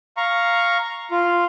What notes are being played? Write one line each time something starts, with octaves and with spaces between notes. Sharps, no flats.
F5 A#5 C#6
F4